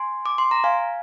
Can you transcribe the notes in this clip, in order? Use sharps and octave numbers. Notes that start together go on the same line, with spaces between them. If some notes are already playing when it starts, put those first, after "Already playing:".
Already playing: G#5 C6
D6
C6
A#5
F5 G#5